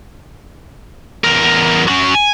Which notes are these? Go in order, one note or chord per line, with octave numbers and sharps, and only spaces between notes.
E2 A#4
C#4 F#4
G#5